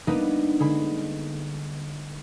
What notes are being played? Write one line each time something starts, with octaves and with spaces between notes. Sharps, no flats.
G3 A#3 B3 D4 D#4 B4
D3 G#3 B5